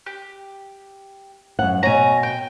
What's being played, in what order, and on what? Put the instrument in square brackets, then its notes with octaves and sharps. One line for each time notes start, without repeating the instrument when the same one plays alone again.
[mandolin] G4
[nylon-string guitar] F#2 F#5
[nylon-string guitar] B2 C#5 [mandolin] G#5 A#5
[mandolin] G5